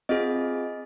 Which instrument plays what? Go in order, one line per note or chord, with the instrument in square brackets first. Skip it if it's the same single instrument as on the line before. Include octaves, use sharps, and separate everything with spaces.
[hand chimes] C4 F4 G#4 D#5